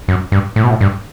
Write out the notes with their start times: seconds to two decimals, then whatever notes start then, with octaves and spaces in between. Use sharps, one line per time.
0.08 F#2
0.32 G2
0.56 A2
0.64 B2
0.70 A2
0.81 G2